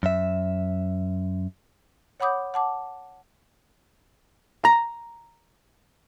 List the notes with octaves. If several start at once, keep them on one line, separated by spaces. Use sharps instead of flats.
F#2 E5
C#5 F#5 B5 D6 D#6 G6
F#5 A5 D6
A#5